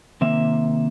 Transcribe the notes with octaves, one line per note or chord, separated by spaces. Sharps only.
C3 D#3 A#3 E5